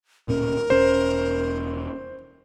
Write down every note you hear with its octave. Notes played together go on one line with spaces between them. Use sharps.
D1 A#2 C#4 A#4
E1 C#4 C5